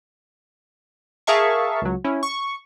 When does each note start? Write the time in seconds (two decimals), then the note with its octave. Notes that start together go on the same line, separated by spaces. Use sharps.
1.27 G#4 A#4 E5 F5 A5 C#6
1.82 C#2 F#3
2.04 C#4 E4
2.23 C#6